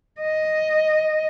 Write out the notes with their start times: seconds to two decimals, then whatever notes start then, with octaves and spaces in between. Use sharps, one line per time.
0.21 D#5